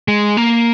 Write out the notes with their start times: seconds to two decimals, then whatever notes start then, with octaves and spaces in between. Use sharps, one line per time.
0.08 G#3
0.37 A#3